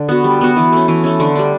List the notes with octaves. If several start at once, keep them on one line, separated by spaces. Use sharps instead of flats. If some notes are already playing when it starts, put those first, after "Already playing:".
Already playing: D3 D4
B3 F#4
G3
B3 F#4
E3
A3 C#4
E3
A3 C#4
D3
G3 D4